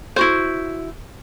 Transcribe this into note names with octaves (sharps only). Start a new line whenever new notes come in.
E4 F#4 C5